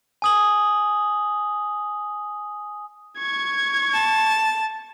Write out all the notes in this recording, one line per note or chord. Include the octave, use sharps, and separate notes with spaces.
G#5 D#6 F#7
C#6 G#6
A5